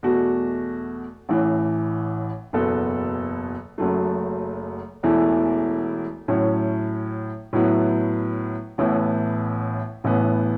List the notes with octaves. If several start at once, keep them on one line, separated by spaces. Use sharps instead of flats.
E2 B2 A3 F#4
A1 A2 E3
F#1 E2 B2 B3 A4
F#1 F#2 F#3 A3
E1 E2 E3 A3 E4
A2 F#3 C#4 E4 C#5
A2 F#3 B3 E4
A1 A2 E3 B3 E4
A1 A2 E3 B3